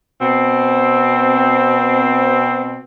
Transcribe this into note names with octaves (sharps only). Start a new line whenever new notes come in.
B2 C4